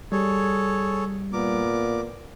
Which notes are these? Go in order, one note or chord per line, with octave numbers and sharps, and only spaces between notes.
G3 G#4 A4 C#5
A#2 B3 A#4 D6